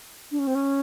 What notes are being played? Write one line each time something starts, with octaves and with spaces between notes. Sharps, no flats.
D4
C#4
C4
C#4